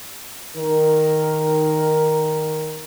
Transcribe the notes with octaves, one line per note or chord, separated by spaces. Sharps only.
D#3 A#4